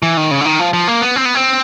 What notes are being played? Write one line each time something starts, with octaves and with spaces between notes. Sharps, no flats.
E3
D#3
C#3
D3
D#3
F3
F3
A#3
B3
C4
B3
C4